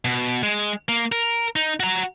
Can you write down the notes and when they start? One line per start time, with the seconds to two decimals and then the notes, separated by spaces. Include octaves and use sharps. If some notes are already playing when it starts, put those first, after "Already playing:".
0.05 B2
0.43 G#3
0.89 A#3
1.12 A#4
1.56 D#4
1.80 F#4 A#5